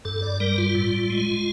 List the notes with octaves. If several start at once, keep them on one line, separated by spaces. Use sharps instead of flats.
G2 A4
D5
G3 A#4
F4
A2
G#3